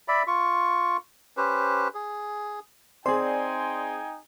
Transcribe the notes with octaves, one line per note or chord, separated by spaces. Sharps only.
D5 E5 B5
F4 C#6
C#4 G4 B4 C5
G#4
C4 D#4 G#4 D5 G5 G#5 C6